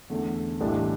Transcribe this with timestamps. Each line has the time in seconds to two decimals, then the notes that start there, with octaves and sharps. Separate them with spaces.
0.10 E2 D3 A3 C#4
0.61 B1 A2 E3 G3 D4